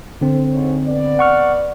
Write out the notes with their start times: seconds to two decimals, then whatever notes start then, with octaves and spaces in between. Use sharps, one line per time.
0.21 D3 C4 C5
0.53 G#2 C#5
0.87 B3 D5
1.19 F#5 C#6 F6